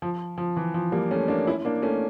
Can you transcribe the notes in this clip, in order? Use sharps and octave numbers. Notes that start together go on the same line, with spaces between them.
F3
F3
E3
F3
G3 A#3
A3 C#4
A#3 D4
C#4 E4
A#3 D4
A3 C#4